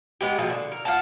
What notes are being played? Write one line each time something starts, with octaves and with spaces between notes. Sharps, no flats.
G#3 B3 G4
B2 F3 A#3 G#4
D3
A#4
F4 F#5 A5